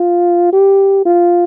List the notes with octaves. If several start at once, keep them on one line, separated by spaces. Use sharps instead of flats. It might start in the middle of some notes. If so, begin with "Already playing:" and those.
Already playing: F4
G4
F4